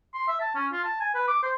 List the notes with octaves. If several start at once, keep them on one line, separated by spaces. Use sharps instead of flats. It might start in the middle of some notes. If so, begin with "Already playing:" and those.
C6
E5
A5
C#4
F4
A5
G#5
B4
D6
C5